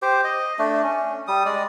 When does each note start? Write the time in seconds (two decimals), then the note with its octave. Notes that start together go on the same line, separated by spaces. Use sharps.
0.02 G4 C5
0.24 D#5
0.59 A3 D4
0.84 C#4
1.27 G3 D#6
1.46 G#3 D5